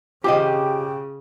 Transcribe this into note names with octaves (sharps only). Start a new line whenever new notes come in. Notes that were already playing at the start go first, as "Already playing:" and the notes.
C#3 F4 G4 C5 D#5 G5 D6